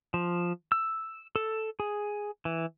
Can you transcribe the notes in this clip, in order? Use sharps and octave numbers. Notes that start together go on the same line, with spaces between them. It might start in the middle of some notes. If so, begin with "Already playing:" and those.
F3
E6
A4
G#4
E3